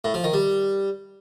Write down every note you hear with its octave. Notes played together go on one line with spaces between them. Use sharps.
A2
F3
D#3
G3